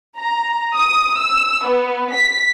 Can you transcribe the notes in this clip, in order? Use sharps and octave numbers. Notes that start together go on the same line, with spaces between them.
A#5
D#6
E6
B3
B6